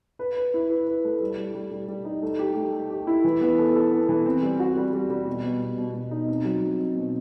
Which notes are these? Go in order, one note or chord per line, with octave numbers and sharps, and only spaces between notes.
B4
B4
E4
B4
B4
A3
G3
G3
G3
G3
G3
D#4
A3
G4
A3
A3
G4
E4
E3
B3
A4
A4
B3
E3
C4
G3
F#4
G3
G3
G3
B2
B2
B2
B2
B2
D#4
C4
F#3
C4
C4
B2